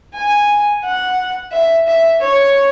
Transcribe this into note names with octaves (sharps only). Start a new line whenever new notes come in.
G#5
F#5
E5
E5
C#5